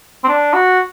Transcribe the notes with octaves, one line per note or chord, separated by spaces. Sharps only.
C4
D4
F#4